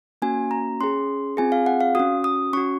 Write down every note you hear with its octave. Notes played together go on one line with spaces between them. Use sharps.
A#3 C#4 F#4 G#5
A#5
C#4 G#4 C6
C4 F4 G#4 G#5
F5
F#5
F5
C#4 F#4 D#6
D#6
C#4 F#4 C#6